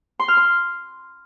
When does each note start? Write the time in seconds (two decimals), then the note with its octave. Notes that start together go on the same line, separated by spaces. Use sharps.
0.19 C6
0.28 F6
0.37 C6